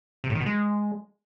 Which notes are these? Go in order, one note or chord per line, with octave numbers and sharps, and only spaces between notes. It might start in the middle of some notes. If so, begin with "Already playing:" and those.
C3
A2
D#3
B2
G#3